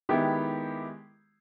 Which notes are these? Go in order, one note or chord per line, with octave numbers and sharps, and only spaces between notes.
D#3 G#3 B3 E4 G4